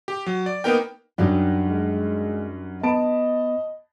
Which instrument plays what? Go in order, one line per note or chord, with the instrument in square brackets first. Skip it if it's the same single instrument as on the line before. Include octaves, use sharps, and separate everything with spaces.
[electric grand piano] G4
F#3
D5
A#3 B3 D#4 A#4 G5
[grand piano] F#2 F#3 G3 [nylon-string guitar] D4 D#4 G4
[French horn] G#3
[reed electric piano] B3 [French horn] D#5 [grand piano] A5 B5 D7